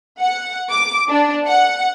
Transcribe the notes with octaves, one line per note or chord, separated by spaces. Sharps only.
F#5
D6
D4
F#5